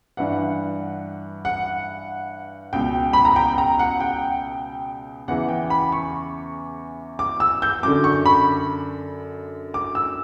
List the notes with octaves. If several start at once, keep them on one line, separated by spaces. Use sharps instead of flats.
G2 E3 F#5
F#5
C#2 B2 G5
B5
A#5
G5
A#5
F#5
G5
E2 C#3 E3 F#5
G5
B5
C#6
D6
E6
G6
F#2 D3 D6
C#6
B5
D6
E6